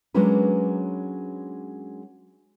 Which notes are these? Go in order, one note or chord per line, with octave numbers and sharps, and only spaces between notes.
F#3 G#3 A#3 C#4 D4 B4